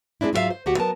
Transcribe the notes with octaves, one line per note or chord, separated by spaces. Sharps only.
G#3 A3 C4 D4 E4
G#2 F#3 F4 F#4 E5 F5
C5
D2 F#4 G4 F#5
F#3 B3 A#4 A5